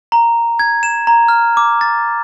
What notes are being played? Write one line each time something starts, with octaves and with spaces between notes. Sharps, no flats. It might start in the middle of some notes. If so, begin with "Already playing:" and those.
A#5
G#6
E7
A#5
F6
D6
A6